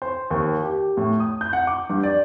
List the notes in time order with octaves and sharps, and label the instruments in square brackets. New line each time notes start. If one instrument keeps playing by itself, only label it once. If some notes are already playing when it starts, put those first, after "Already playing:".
[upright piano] C5
D#2
G4
A2
D#6
G6
F#5
D6
G2
D5